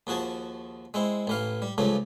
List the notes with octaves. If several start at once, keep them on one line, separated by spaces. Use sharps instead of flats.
D#2 F3 F#4 G#4 A5
G#3 C4 E4
A1 E3 F5
G3
C#2 G2 C#3 F3 A3